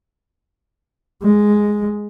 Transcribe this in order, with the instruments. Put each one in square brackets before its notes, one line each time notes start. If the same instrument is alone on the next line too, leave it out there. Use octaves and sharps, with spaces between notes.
[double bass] G#3